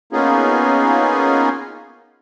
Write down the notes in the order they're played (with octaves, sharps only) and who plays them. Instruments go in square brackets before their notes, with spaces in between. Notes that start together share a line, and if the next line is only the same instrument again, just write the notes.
[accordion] A#3 B3 C#4 D#4 F4 G#4